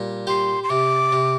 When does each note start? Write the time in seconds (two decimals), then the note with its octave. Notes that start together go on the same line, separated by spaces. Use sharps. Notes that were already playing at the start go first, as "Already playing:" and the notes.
Already playing: A#2 G3
0.27 G4 C6
0.64 C6
0.70 C3 D6
1.12 C3